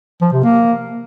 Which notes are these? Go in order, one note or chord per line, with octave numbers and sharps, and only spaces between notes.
F3
C3
A#3